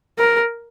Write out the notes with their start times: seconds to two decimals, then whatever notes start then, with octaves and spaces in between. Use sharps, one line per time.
0.18 A#4